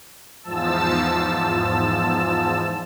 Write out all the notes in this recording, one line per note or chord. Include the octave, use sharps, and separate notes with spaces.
E2 G#2 F3 A5 E6